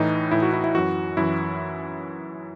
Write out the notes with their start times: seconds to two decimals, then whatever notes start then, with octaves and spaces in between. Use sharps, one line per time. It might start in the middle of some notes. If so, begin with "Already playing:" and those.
Already playing: A2 E3 D#4
0.31 A2 E3 E4
0.42 F#4
0.53 E4
0.64 E4
0.74 F#2 E3 F#4
1.17 F#2 E3 E4